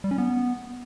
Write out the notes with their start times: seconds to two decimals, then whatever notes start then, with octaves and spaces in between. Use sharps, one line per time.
0.04 G3
0.11 C#4
0.18 B3